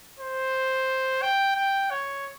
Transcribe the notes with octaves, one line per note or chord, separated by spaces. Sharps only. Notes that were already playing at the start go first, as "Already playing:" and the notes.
C5
G5
G5
C#5